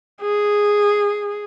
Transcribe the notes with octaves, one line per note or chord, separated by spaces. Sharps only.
G#4